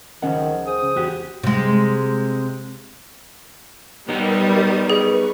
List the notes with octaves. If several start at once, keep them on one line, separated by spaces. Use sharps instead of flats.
C#2 D#3 F3 C#4 F#5
G#4 C5 D#6
E2 F#4 G4
C3 G#3
G3 B3 D#4 A#4 D#5 D#6
G#4 B4 C#6